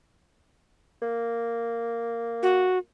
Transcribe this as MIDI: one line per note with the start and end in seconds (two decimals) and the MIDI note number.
1.02 2.85 58
2.43 2.78 66